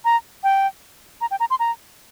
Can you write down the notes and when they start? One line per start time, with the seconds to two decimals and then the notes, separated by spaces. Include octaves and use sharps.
0.05 A#5
0.44 G5
1.21 A#5
1.31 G5
1.40 A#5
1.50 C6
1.59 A#5